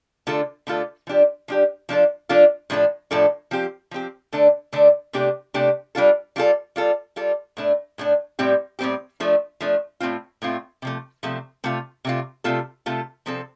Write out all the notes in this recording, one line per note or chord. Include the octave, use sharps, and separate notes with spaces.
D3 A3 F4 A4
D3 A3 F4 A4
F3 D4 G4
F3 D4 G4
F3 D4 F4 A4
F3 D4 F4 A4
A2 F3 D4 A4
A2 F3 D4 A4
F3 C4 G4
F3 C4 G4
D3 A3 D4 A4
D3 A3 D4 A4
C3 A3 D4 G4
C3 A3 D4 G4
G3 D4 F4 A4
G3 D4 F4 A4
G3 F4 A4
G3 F4 A4
A2 A3 D4
A2 A3 D4
A2 G3 C4 G4
A2 G3 C4 G4
F3 A3 D4
F3 A3 D4
A2 A3 C4 F4
A2 A3 C4 F4
C3 F3 A3
C3 F3 A3
C3 A3 F4
C3 A3 F4
C3 A3 F4 A4
C3 A3 F4 A4
C3 F3 C4 A4